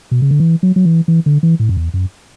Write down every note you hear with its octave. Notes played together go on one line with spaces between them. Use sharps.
B2
C#3
D3
E3
F#3
F#3
E3
E3
D3
E3
A2
F#2
E2
F#2